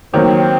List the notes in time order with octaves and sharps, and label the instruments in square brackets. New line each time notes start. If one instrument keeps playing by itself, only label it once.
[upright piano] D#3 F#3 A#3 [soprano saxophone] C4